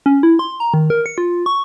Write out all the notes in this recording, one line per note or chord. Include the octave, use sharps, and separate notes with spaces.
C#4
E4
C6
A#5
D#3
A#4
C#7
F4
C#6